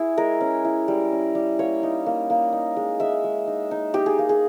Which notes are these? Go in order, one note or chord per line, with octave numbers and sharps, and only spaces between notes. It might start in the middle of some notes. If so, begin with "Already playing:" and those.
Already playing: E4 G#4
G#3 A#4
C#4
E4
G3
C#4
G3
A#3 C#5
D#4
A#3
A#3
D#4
G#3
G#3 E5
G#3
D#4
D#4
D#4 G4
G#4
A#3
G#4